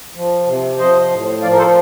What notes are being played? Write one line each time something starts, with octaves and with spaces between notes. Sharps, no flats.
F3
C3
F3 C5 D#5
A2
F3 D5 F5
A#4
A4 C5